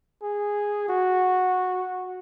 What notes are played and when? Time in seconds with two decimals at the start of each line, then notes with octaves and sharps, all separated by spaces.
0.22 G#4
0.89 F#4